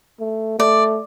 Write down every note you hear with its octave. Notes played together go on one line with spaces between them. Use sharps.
A3
A3 D5